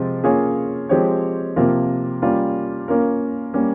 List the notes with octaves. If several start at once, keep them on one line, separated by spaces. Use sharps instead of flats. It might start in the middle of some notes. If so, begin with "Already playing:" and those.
Already playing: C3 F3 G#3 C4 F4
A#3 C#4 F4 G#4 C#5
F3 G#3 C4 G4 C#5
C3 F3 A#3 F4 A#4
G3 A#3 C#4 F4 A#4
A#3 C#4 F4 A#4
G3 A#3 C#4